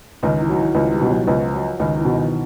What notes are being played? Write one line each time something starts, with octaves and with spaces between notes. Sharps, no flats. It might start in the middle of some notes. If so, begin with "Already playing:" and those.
C#2 D#3
E3
F#3
E3
C#2 F3
G3
B2
F#3
C#2 F3
F#3
C#2 D#3
E3
B2
D#3